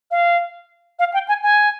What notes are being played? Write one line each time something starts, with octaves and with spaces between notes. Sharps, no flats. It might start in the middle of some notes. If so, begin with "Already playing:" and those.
F5
F5
G5
G#5
G#5